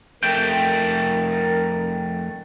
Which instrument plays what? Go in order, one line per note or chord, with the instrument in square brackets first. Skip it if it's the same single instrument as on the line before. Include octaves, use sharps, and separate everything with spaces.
[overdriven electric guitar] F2 A3 [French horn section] A#4 [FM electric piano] G5